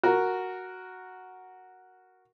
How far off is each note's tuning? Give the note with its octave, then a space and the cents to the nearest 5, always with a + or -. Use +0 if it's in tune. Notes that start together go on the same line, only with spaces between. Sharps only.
F#4 +0 A#4 +0